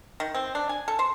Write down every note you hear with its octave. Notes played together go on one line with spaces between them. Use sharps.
D#3
C4
D4
G#5
A4
C5